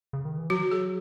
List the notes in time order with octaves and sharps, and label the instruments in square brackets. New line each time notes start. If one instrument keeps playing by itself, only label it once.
[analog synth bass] C#3
D#3
E3
[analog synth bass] F#3 [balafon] F#4
[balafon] G#4